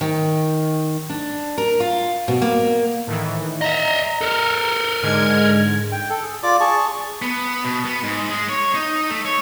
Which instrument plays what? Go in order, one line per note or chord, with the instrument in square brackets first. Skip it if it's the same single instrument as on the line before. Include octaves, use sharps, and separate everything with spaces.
[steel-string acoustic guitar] D#3
D4
A#4
F4
B2
A#3
[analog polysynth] A2 D#3 E3
[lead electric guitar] D#5 E5 [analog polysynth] A#5
[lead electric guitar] A4 A#4
[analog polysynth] G#2 D3 G#6 [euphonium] G#3
[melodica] G5
A4
G#4
F4 D5 D6
G#4 A5 C#6
[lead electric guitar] B3
B2
B3
G#2
G#3
C#5
D#4
A3
C#5